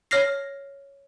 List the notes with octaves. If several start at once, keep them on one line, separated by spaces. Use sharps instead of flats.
C#5 F6 A#6 C7